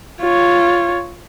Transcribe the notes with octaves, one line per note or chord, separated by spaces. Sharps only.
F4 C#5